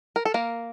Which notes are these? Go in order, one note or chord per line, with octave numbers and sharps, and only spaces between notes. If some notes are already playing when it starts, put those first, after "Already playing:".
A#4
A4
A#3 A#4